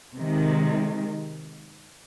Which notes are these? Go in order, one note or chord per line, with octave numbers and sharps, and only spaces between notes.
C3 D#3 G#3